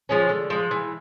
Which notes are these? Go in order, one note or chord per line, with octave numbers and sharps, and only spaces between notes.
F3 G#3 C#4
D3
F3 G#3
E3